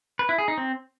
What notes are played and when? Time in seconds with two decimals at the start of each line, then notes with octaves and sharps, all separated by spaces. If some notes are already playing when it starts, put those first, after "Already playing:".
0.19 B4
0.29 E4
0.38 G#4
0.48 D#4
0.58 C4